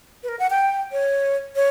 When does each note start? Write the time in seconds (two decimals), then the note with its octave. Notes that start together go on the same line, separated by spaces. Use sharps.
0.23 B4
0.29 A#4
0.39 F#5
0.50 G5
0.92 C#5
1.56 C#5